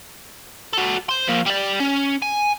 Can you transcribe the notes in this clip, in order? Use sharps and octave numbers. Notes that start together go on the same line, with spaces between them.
F#4 A4
C5 C6
F3 A#3
G3 D5
C#4
G#5